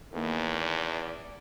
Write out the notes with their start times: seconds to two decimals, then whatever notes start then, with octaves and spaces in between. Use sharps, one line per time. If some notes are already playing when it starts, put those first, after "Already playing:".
0.13 E2 D#3 A#3
0.58 D5